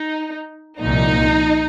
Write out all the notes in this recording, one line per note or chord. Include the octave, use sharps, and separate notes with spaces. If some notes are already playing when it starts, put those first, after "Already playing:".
Already playing: D#4
C2 A#2 F3 D#4